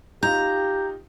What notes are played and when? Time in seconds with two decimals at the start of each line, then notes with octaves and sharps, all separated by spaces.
0.23 D#4 F4 G4 A#5 G6